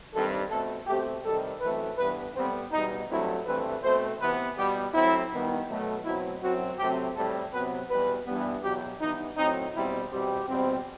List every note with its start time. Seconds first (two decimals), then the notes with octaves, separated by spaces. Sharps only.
0.14 G2 D#3 G3 C4 A4
0.50 B2 A3 C4 A4
0.87 B2 A3 C4 G4
1.24 C3 D#3 G3 A4
1.61 F#2 E3 A3 C4 B4
1.98 G2 E3 B3 B4
2.36 A2 G3 B3 C4
2.71 E2 B2 G3 B3 D#4
3.09 G2 F#3 A3 C4 E4
3.46 G2 E3 A3 C4 B4
3.82 B2 A3 C4 C5
4.20 C3 E3 B3 B4
4.56 B2 G3 B3 G4
4.94 A2 F#3 C4 E4
5.31 G2 D#3 G3 B3
5.68 B2 F#3 A3
6.04 B2 F#3 C4 E4
6.42 F#2 F#3 C4 F#4
6.78 C3 F#3 A3 C4 G4
7.15 A2 G3 C4 A4
7.52 C3 F#3 B3 B4
7.89 E2 B2 G3 B4
8.26 G2 E3 G3 B3
8.63 E2 B2 F#3 G4
9.01 G2 E3 B3 D#4
9.37 A2 F#3 C4 D#4
9.74 E2 B2 G3 C4 E4
10.11 E2 B2 G3 C4 G4
10.47 E2 B2 G3 C4